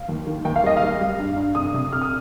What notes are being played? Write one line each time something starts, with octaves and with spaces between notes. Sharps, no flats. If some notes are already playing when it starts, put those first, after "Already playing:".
Already playing: F5
D#2
D#3
D#2 G5
F5
G3 D#5
F5
G3
G3
G2
G2
C2 D#6
C3
C2 F6
D#6